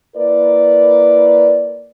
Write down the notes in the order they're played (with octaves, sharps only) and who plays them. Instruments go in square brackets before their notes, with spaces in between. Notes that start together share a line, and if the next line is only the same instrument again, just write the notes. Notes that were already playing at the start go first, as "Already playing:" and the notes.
[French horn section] A#3 E4 A#4 B4 D5